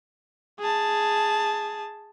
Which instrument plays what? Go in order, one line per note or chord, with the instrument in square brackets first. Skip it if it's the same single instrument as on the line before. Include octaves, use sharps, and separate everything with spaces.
[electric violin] G#4 A5